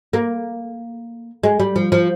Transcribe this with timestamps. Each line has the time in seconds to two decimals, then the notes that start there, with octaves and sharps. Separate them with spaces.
0.13 A#3
1.43 G#3
1.60 G3
1.76 F3
1.92 F3